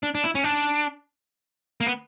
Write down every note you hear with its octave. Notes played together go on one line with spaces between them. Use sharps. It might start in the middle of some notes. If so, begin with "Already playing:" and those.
D4
D4
E4
C#4
D4
A#3
B3